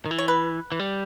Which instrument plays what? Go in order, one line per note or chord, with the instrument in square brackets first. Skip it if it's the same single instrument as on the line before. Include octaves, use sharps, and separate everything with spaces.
[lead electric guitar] D#3
E3
[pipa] C#5
B4
[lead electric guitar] E3
G3